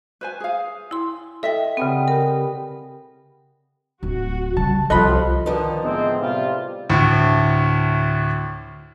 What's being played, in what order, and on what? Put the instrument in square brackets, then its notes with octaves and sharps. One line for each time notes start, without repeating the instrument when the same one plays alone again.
[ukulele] B4 C5 G#5
G#4 F5
[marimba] E4 C6 [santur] G#5
[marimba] A4 G5 [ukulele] D#5 E5
[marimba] C#3 C4 [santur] G3 G#3 B3
[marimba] G4 A#4
[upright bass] D1 [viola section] F#4
[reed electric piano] C#3 A5 [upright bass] G3
[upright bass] C2 [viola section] F3 F#3 [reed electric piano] A4 C6 F#6 [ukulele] D#5 B5
[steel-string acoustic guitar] D3 F3 D#4 [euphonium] D#3 [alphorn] B4
[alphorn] A2 [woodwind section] G#3 C4 [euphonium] B3
[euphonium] C3 [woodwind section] G3 F4
[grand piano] D2 A2